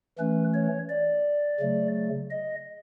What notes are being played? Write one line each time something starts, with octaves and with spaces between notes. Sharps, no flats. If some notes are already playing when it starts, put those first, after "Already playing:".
E3 A3 C#4 B4
C#5
D5
C#3 F#3 A3
D#5